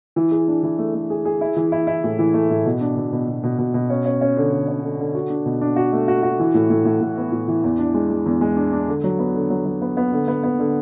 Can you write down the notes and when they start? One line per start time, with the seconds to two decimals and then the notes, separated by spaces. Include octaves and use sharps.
0.16 E3
0.31 G#4
0.48 D4
0.63 E3
0.78 A3
0.95 A3
1.10 G#4
1.25 G#4
1.41 E4
1.56 E3
1.72 E4
1.87 E4
2.04 A2
2.19 E3
2.34 A3
2.50 A2
2.65 B2
2.81 D4
2.97 B2
3.12 B2
3.28 B2
3.43 B2
3.59 B2
3.74 B2
3.90 C#4
4.06 C#4
4.21 C#4
4.37 D3
4.52 D3
4.68 C#4
4.83 D3
4.99 D3
5.15 F#4
5.30 D4
5.46 B2
5.61 D4
5.76 F#4
5.93 A3
6.08 F#4
6.23 F#4
6.40 E3
6.54 A2
6.70 A2
6.85 A2
7.01 A2
7.17 B3
7.32 A2
7.48 E3
7.64 E2
7.79 D4
7.94 G#3
8.10 G#3
8.26 E2
8.41 G#3
8.57 D4
8.73 D4
8.88 D3
9.04 F#3
9.19 B3
9.35 D3
9.50 F#3
9.66 F#3
9.82 B3
9.97 B3
10.12 D3
10.28 B3
10.43 B3
10.59 D3